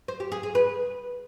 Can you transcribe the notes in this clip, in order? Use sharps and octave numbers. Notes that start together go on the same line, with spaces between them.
C5
G4
G#4
G#4
B4